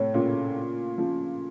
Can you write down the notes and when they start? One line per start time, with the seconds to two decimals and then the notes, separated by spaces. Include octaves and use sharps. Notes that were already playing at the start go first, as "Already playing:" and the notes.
Already playing: A2 C3 C#5
0.14 A#2 C#3
0.98 C#3 F3